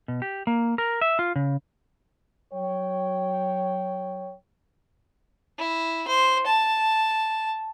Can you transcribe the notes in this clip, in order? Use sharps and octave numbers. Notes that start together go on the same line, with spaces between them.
B2
G4
A#3
A#4
E5
F4
C#3
F#3 C#5 G5
E4
C5
A5